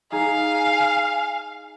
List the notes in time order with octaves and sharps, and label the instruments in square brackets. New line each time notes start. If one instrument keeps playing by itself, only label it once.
[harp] D#4 G#4 [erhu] F5 [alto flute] G#5